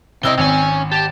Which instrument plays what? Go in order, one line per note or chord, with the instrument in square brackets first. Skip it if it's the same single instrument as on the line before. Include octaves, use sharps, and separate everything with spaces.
[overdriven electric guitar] C3 E4 [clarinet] C4 [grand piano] D#5 E6 G7
[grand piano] G#1 [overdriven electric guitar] C#4 G#5
[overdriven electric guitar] G4 [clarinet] A5